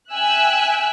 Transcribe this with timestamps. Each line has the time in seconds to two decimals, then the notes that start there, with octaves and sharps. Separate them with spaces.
0.12 E5 G5 G#5 E6 F#6